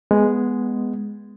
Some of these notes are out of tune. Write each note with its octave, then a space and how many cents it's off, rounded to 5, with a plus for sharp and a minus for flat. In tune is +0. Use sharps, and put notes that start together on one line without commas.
G#3 +0 B3 +0